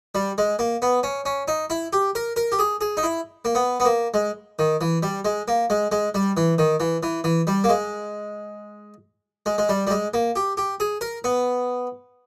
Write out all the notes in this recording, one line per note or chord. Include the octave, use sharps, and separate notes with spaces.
G3
G#3
A#3
B3
C#4
C#4
D#4
E4
G4
A#4
A#4
G4
G#4
G#4
D#4
E4
A#3
B3
B3
A#3
G#3
D#3
E3
G3
G#3
A#3
G#3
G#3
G3
E3
D#3
E3
E3
E3
G3
A#3
G#3
G#3
G#3
G3
G3
G#3
A#3
G4
G4
G#4
A#4
B3